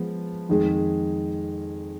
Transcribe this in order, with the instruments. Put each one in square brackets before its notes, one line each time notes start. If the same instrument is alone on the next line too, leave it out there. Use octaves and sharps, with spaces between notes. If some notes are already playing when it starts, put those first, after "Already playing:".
Already playing: [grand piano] F3 G#3 B3
F2 D#3 G#3